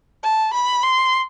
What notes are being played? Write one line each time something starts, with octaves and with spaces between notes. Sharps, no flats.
A5
B5
C6